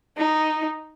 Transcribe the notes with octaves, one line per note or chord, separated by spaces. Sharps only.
D#4